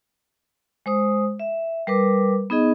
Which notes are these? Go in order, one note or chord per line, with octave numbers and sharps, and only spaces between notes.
G#3 C5 D#6
E5
G3 A#4 B4 D6
B3 D#4 G#4 D#5